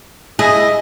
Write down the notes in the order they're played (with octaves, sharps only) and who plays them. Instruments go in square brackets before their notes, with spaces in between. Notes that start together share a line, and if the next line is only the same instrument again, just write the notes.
[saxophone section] E4 D#5 [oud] G#4